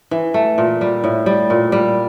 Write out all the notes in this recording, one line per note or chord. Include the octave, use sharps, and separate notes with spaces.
E3
A3
A#2
G3
A2
G3
A#2
G3